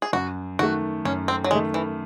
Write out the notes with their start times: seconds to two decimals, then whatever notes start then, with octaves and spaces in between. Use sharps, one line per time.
0.02 G#4
0.13 F#2 F#4
0.59 D#3 A3 F#4
1.05 F#2 C#4
1.28 C4
1.44 F#3
1.51 D#3 G#3 A3
1.74 E3